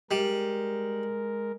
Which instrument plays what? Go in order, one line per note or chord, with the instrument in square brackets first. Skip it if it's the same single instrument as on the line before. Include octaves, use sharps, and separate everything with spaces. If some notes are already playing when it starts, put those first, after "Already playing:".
[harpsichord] G3 [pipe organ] G#3 A#4